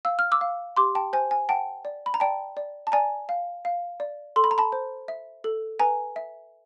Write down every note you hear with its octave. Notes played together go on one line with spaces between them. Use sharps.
F5 E6
F6
D6 E6
F5
G4 C6 D6
G5 A5
C5 G#5
G#5
F#5 G5 A5
D5
B5
A#5
D5 G5 A5
D5
A5
D5 G#5 A#5
F5
F5
D5
A4 C6
B5
A#5
A5 B5
C5
E5
A4
B4 G#5 A#5
E5